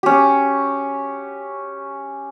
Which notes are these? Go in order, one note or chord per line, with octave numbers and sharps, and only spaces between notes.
C#4 G4